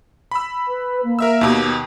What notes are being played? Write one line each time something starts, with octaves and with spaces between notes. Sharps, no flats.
B5 E6
B4
A#3
A#4 E5 E6
D#2 B2 G4